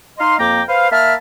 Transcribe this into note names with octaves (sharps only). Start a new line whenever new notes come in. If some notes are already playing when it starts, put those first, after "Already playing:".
D#4 D#5 F5 C6
F2 A#3 G5 A#5 D6
B4 C5 F5
A#3 E5 A5 B5 F6